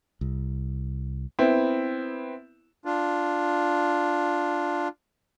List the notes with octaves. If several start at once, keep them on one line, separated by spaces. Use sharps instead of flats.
C2
B3 C4 E4
D4 F4